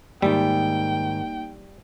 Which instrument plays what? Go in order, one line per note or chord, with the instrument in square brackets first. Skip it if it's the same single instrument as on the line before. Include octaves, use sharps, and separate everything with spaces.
[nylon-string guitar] G#2 D#3 [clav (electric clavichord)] G3 [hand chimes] A#3 D#4 [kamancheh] G5